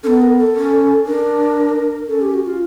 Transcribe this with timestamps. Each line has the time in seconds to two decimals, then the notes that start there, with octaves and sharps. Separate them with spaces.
0.04 C#4 A4
0.07 B3
0.22 A#4
0.39 A4
0.56 C#4
1.06 D4 A#4
2.08 C#4 A4
2.21 G4
2.34 F#4
2.46 F4